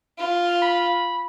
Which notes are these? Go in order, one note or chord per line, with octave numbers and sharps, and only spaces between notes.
F4
B5